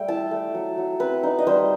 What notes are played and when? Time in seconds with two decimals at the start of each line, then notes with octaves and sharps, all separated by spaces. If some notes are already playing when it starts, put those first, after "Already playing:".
Already playing: G3 A3 G5
0.08 E4 A5
0.31 A3
0.55 F#3
0.78 F#3
1.00 C4 B4
1.23 D#4
1.39 D#5
1.47 G3 C5